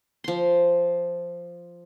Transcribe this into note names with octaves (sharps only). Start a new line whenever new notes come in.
F3 C6